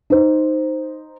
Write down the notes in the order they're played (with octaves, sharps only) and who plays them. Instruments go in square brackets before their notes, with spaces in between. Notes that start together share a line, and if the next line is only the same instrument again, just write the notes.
[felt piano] D#4 C5